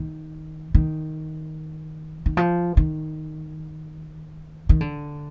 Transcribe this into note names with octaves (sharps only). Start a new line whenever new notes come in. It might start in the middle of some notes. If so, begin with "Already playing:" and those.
Already playing: D#3
D#3
D#3
F3
D#3
D#3
D3